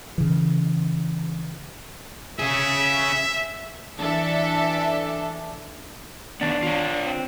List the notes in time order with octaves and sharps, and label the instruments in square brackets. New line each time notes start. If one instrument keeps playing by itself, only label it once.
[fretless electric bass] C#3 E3
[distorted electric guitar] C#4 G#4 [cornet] E5
[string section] E3 D4 A4 E5
[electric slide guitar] D#3 B3 [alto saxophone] D4
[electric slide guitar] F4 C#5
[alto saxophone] C4